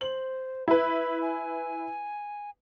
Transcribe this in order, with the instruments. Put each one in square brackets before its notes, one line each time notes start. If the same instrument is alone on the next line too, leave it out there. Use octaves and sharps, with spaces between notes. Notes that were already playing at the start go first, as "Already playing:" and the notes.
[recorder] C5 [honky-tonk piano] F#7
[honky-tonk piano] E4 B4 [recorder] B5
[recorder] G#5